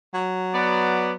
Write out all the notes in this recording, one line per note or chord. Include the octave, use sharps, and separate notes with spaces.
F#3
B3 D5